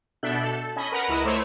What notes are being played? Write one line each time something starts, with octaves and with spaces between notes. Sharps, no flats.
B2 D4 A4 E5 F#6 G6
A4
C#4 D#5 G#5 B5
A#4 B4 F#5 A#5 F6
C#2 E4 D#5
A3 C5 C#5